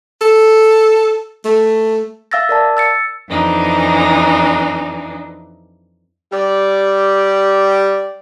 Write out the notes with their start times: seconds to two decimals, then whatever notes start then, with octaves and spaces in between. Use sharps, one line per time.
0.21 A4
1.45 A3
2.31 E5 F5 E6 A6 A#6
2.49 A#4 D5 A5
2.77 E6 A6 C#7
3.29 F2 E3 D4 D#4
6.33 G3 G4 D5